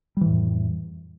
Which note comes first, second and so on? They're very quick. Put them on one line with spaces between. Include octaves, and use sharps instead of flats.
G3 E3 A2 F2